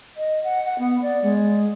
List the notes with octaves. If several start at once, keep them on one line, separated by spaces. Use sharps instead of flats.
D#5
F#5
F#5
B3
D5
G#3